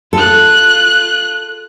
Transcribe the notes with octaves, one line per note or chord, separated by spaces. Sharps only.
F4 A4 F#6